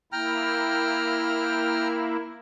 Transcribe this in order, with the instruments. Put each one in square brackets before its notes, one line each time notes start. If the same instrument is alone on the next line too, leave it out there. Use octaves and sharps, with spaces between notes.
[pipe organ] A#3 E4 [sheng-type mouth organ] G5 A#5 F6